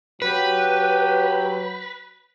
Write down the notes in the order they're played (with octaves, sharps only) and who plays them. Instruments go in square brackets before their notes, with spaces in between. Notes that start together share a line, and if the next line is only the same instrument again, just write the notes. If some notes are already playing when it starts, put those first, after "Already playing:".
[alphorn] F#3 [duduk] G4 [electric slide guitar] B4